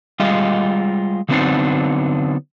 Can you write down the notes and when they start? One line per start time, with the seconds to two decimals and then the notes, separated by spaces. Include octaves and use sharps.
0.20 G3 G#3 F4 D#5
1.29 D3 F#3 B3 C4 D4 D#4